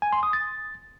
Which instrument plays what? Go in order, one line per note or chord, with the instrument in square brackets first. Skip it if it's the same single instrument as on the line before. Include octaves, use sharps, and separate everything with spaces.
[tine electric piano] G#5
C6
D#6
A6